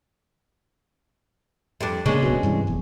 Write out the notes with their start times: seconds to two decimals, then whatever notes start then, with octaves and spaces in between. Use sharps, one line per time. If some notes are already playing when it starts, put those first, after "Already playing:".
1.81 F2 G3 D4
2.06 C#3 G#3 A#3 C#4 D4
2.22 D1 B1 B2
2.43 G2 C3 E3
2.67 F1 E2